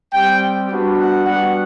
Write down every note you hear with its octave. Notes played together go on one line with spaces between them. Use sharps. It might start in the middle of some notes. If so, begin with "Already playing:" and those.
G3 C4 G4 G5
G3 B3 D4 F#4
F#5
G3 B3 D4 F#4 F#5